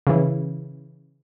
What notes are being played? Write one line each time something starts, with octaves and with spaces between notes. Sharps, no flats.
C#3 E3